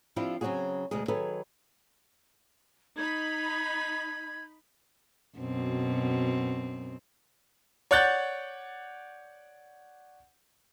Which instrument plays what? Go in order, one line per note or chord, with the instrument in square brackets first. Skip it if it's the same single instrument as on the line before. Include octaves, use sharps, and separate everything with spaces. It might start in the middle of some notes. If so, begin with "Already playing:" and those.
[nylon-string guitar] F3 C4 D4 E4 F4 G4
C#3 F#3 C4 C#4 F#4 G#4
D2 B2 G3 G#3 G#4
D#3 F#3 G#4 A4 B4
[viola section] D#4 B5 [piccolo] G#6
[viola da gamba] F#2 B2 C4
[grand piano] C#5 D5 F#5 F#6 G6 A6